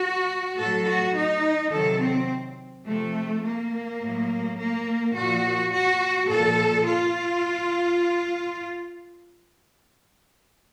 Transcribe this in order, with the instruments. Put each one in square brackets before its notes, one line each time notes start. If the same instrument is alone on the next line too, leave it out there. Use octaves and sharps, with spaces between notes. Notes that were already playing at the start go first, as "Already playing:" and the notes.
Already playing: [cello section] F#4
A2 F#3 A4
F#4
D#4
C3 D#3 F#3 A4
C4
C3 F3 A3
A#3
A2 F#3
A#3
A#2 F3 F#4
F#4
A#2 F3 A4
F4